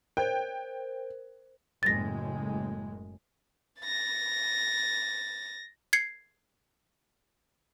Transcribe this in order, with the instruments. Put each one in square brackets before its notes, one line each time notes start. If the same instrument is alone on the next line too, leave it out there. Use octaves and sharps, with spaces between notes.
[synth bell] A#4 C5 [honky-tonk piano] G5
[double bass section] F#1 A2 G#3 [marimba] A6 A#6
[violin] A6 A#6
[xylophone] G#6 C7 C#7